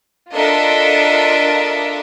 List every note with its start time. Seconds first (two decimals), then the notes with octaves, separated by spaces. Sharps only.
0.32 D4 F4 A4 A#4 D#5 E5